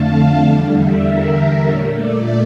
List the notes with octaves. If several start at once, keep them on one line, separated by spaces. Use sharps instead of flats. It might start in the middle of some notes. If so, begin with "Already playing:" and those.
Already playing: F2 D3 A3 F5 A5
E2 D3 G3 D5
E5
A#4
A#2 A3 C#5
D5